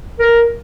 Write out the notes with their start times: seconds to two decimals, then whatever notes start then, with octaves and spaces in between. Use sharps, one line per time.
0.20 A#4